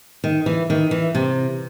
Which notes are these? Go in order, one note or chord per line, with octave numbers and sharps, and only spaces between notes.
D#3
E3
D#3
E3
C3